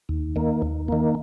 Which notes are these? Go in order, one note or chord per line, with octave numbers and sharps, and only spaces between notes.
D#2
D#3 A#3
D#2
D#3 A#3